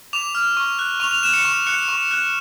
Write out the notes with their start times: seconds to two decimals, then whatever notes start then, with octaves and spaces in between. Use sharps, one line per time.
0.13 D6 F7
0.35 F6
0.57 C#6
0.79 F#6
1.00 C#6 F7
1.11 F7
1.23 F#6 E7
1.33 C#7
1.45 C#6
1.67 F#6 C#7
1.88 C#6
2.11 F#6